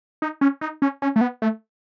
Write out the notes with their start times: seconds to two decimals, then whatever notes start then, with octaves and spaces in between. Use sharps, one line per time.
0.22 D#4
0.41 C#4
0.61 D#4
0.82 C#4
1.02 C#4
1.16 A3
1.21 B3
1.42 A3